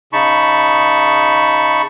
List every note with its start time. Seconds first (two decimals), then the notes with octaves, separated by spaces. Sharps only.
0.13 C#3 D#4 A5 B5 C#6